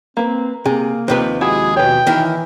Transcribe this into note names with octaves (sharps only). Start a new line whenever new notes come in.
A#3 C4 B4
C3 A#3 G#4
D#2 C3 F3 B4 C5
G#3 E4 F#4 G#4
B2 B4 C#5 G5
D#3 E3 E4 A#4